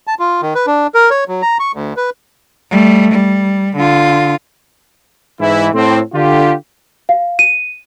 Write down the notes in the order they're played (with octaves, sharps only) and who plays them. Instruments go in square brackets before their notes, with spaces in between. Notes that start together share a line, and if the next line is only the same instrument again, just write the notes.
[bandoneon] A5
F4
D#3
B4
D4
A#4
C#5
F#3
A#5
C#6
D2
B4
[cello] G3 A3
G3
D3 F4
[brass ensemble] G#2 E3 E4
A2 C4
D3 F4 G4
[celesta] F5
D#7